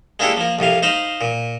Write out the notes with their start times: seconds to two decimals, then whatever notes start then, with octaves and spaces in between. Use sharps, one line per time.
0.19 G#3 A#3 D4 E4 G4 A4
0.37 F3 A#3
0.59 C2 F2 C3 F5
0.83 D#4 C5 F5 B5
1.21 A#2